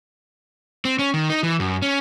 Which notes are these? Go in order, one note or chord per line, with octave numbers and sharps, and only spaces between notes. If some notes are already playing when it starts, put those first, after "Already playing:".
C4
C#4
D#3
D#4
E3
F#2
C#4